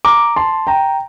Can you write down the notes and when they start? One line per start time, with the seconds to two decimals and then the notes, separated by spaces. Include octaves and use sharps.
0.05 A#5 D6
0.36 A5 C6
0.67 G5 A#5